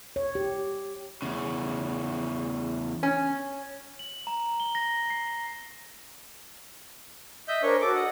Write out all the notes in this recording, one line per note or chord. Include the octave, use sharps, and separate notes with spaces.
C#5
G4
E2 C#3
C#4
F#7
A#5
G7
A#6
C7
D#5 E5 G6
D4 A#4 C5 C#5 G#5
F#4 A4 D6
D#5 F#5